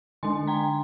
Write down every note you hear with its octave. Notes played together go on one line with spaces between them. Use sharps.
D3 G#3 D4 G#5 C6
G5 A#5